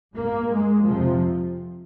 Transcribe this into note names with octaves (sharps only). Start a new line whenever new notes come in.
G2 A#3
G#3
F2 C3 F3